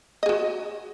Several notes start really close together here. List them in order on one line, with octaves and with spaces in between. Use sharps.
D#5 G#4 F#4